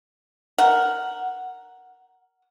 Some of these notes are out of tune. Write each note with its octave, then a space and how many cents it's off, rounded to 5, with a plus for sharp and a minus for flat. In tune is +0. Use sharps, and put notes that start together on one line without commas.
A#4 +0 F#5 +0